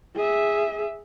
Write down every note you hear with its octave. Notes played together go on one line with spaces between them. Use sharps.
G#4 E5